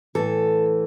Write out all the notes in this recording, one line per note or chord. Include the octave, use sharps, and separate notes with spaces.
A2 E3 A4